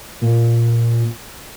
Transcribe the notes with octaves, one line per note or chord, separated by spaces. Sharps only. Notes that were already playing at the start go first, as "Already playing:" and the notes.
A#2